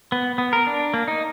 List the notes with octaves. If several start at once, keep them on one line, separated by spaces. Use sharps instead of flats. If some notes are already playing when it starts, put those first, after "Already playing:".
B3
B3
A#4
D4
A#3
D#4